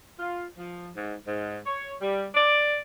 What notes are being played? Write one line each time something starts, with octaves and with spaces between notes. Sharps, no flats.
F4
F3
G#2
G#2
C#5
G3
D5